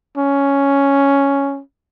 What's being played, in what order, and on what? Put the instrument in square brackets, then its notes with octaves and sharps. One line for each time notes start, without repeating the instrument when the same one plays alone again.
[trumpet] C#4